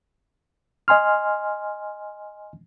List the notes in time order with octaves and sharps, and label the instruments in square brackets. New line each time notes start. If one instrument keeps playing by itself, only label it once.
[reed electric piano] D#5 G#5 C6 F6